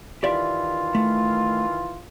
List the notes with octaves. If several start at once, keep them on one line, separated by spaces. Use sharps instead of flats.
D#3 E3 F4 G4 D5 E5
A3